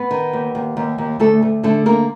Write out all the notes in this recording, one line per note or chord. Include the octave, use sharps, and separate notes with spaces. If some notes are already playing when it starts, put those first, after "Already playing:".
Already playing: B3 B4
D#3
D#2
D#2
D#2
D#2
D2 A3 A4
D2
D3 A3 A4
D3 A#3 A#4